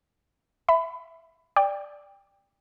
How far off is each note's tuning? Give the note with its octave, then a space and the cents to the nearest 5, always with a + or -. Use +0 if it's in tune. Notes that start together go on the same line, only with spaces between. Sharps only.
E5 +5 B5 +30
D5 +0 G5 +25